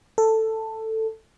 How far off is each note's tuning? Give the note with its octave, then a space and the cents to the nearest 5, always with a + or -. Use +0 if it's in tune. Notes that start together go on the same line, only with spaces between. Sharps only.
A4 +10